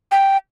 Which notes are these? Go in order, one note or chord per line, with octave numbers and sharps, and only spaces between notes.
G5